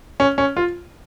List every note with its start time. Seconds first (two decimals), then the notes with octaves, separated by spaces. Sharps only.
0.20 C#4
0.38 C#4
0.57 F4